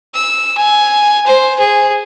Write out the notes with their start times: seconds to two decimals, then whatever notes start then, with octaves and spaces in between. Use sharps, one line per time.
0.15 E6
0.57 G#5
1.26 C5
1.59 G#4